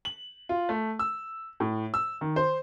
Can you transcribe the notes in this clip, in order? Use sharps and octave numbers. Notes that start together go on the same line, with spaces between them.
F#7
F4
A3
E6
A2
E6
D#3
C5